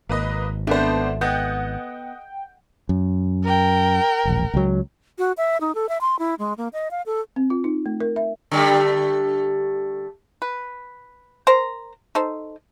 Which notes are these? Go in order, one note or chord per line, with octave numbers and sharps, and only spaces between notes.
G#1 A#3 B4 D#5
A3 B3 C4 D4 C5
B3 D#5 F#5 G5 G6
F#2
A#4 G5
E1 A#1
C#2 F#3
F#4
E5
D#4
A4
E5
C6
E4
G#3
A#3
D#5
F5
A4
C4
F4
D#4
A3
A#4
E5
D3 G3 A3
B4
A#4 C5 A#5
D#4 A4 C5